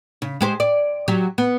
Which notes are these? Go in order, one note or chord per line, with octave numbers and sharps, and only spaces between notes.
C#3
G#3 G4 C5
D5
F#3 G4
B3